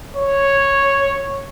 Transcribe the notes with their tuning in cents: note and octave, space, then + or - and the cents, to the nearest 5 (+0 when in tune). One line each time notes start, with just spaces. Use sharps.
C#5 -5